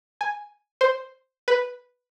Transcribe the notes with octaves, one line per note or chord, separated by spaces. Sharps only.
G#5
C5
B4